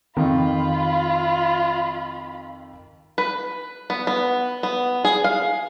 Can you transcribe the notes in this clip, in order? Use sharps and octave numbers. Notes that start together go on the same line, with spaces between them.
F2 D#3 F4 B5
B4
B3
B3
B3
G#4
F5